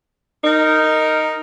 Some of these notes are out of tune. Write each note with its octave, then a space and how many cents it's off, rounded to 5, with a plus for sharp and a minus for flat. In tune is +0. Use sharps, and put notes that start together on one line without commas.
D#4 +0 A#4 -15